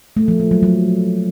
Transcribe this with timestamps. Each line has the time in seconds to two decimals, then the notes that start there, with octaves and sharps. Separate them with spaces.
0.17 A3
0.28 F3
0.40 A#3
0.51 F#3
0.63 F#3